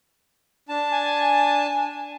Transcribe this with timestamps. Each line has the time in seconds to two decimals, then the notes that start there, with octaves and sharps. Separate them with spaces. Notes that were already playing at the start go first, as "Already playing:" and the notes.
0.69 D4 A5
0.92 G#5